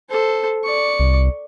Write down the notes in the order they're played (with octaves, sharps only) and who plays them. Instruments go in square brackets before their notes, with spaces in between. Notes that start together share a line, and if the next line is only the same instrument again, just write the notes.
[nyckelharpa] A4 C5
D5 C#6
[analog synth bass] C2